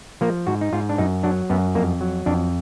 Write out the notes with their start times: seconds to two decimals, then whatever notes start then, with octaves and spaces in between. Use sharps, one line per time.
0.21 F3 A#3
0.47 G#2 F#4
0.61 D#4
0.73 G#2 F4
0.89 D4
0.98 F#2 D#4
1.23 F#3 D4
1.50 F#2 B3
1.75 F2 A#3
2.01 F#3
2.26 F2 D4